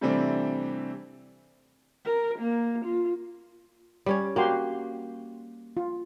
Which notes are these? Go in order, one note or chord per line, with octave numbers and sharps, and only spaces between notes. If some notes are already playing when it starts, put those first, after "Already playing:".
C3 E3 G3 A3 C4 D4
A#4
A#3
F4
G3 C#4 C#5
A#3 F#4 G4 C6
F4